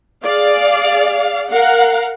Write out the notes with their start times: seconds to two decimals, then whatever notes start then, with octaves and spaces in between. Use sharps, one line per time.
0.24 G#4 D5 F5
1.50 A#4 F5 F#5